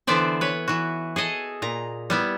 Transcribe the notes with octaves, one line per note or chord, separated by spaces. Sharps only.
D3 E3 B3 C5 D5 E5
B4 C#5
E3 F#4
G#4 A4 D#5 G#5
A#2 A#5
G3 B3 E4